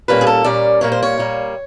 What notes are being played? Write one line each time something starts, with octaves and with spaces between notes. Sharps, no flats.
A#2 G3 A#3 C#4 B4
G#4
A4
A#2 G3 A#3 C#4 D5
A#2 G3 A#3 C#5
C5
C#5
A#2 G3 A#3